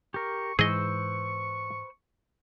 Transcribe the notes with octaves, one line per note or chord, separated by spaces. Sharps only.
G4 A#4 C#6
G#2 E3 G#4 B4 C5 D#5 C#6 E6